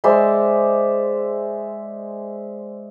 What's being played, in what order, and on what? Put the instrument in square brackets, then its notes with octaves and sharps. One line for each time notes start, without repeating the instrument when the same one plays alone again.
[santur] G#3 C5 D5 E5